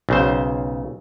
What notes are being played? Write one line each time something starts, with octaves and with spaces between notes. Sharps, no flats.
B1 C#3 C5